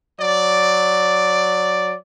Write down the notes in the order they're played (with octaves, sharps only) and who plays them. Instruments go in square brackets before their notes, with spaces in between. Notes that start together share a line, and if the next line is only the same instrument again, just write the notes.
[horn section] F#3 D5